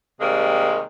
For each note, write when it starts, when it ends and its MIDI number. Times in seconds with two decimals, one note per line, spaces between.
0.20 0.82 48
0.20 0.82 51
0.20 0.82 55
0.20 0.82 56
0.20 0.82 58